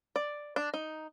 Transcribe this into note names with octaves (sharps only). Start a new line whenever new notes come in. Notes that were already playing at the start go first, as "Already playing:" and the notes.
D5
D4
D#4